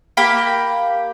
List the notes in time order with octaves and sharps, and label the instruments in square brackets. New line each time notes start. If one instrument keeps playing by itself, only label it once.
[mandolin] A#3 G4 B5